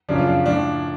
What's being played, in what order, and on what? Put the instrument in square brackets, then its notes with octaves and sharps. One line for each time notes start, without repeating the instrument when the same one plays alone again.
[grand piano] F#2 C#3 F3 D4
F4
D4
A2 F3 D4